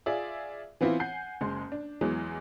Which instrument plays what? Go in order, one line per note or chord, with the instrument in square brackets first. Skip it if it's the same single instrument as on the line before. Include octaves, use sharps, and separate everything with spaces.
[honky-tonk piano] F4 G#4 D5 E5
E3 B3 C4 E4 F4
F#5 G#5 G6 C7
F#1 G#3 C6
D4
E2 E3 F#3 G#3